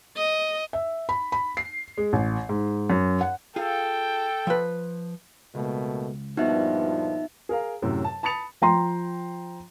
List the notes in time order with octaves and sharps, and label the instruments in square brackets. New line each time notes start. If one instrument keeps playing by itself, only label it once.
[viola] D#5
[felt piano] E5
B5
B5
C7
G#3
A1
G#2
F#2
F#5
[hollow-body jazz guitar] F4 G#4 F5 [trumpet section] A4 G5
[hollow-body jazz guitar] F3 B4
[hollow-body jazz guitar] C#2 [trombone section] B2 A3 A#3
[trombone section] G2 A#2 F3 [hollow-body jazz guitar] B3 F#4 [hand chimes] D#4 E5
[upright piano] G#4 A#4 F5 A#5
F#2 A2 C3
A5
A5 B5 D#6 A6 C#7 F7
[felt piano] F3 G5 A#5 C6